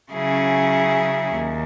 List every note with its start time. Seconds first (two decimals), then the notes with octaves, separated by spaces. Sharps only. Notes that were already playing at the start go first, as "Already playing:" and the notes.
0.12 C#3 F#3 C#4 E4 G#4
1.35 D#2